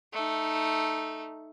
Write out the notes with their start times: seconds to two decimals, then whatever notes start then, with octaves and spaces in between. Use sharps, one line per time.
0.13 A3 D#4